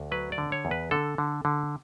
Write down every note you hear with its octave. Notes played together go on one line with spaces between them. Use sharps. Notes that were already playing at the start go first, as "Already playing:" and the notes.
Already playing: D2
F#3 B4
D5
D3
C#5
E2
B4
D3 A4
D3
D3